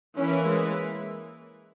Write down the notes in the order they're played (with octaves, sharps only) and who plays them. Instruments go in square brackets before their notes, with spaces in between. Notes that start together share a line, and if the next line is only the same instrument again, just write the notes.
[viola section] E3 A#3 E4 B4 [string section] C#4
[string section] G#3